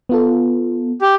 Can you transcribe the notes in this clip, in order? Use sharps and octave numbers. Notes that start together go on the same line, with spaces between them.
B3 F4 A4
G4